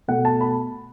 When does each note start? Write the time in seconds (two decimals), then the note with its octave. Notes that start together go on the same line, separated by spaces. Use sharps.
0.08 B2 A3 F#5
0.25 A5
0.41 B5